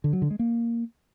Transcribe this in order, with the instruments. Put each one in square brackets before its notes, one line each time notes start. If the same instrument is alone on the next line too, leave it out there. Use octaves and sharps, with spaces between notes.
[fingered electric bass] D3
F#3
D3
G#3
A#3